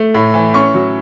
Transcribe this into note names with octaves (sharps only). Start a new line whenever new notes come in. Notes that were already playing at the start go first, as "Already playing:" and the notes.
Already playing: A3
A2
E3
C#4 C#6
F#3